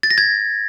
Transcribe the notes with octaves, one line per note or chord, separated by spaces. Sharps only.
A6
A#6
G#6